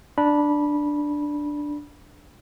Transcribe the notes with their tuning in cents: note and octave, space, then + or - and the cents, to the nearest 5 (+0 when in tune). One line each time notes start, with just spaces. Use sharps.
D4 +0 B5 -20